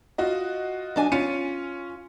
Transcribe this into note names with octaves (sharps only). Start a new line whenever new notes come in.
F4 F#4 D#5
F#3 D4 G#5
C#4 F4 C#7 D#7